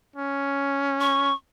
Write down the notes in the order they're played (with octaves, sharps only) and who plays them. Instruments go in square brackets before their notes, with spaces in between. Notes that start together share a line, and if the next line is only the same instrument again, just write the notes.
[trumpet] C#4
[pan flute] C#6